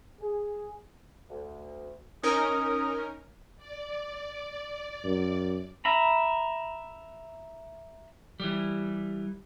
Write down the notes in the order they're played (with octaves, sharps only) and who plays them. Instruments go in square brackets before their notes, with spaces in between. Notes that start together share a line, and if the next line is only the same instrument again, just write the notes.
[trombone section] G#4
[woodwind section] D2
[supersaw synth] C#4 D#4 A#4 [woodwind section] D#6
[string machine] D5
[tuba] F#2
[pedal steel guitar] E5 A#5 B5
[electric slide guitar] E3 G3